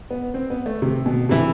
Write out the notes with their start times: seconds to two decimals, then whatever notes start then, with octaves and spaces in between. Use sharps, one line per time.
0.10 B3
0.34 C4
0.50 B3
0.66 A3
0.82 C3
1.06 B2
1.29 C3 E3 A3 E4